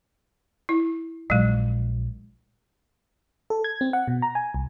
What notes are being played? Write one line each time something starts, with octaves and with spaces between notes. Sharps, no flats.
E4
A#1 F#3 G#3
A4
G#6
C4
F#5
B2
A#5
G#5
C2